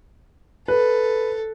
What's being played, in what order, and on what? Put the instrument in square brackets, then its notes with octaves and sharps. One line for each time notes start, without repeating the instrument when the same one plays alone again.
[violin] A4 [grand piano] B4